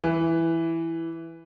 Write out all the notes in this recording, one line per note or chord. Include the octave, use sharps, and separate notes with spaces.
E3